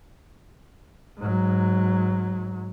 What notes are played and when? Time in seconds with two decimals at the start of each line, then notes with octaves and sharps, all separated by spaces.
1.18 G#2 F#3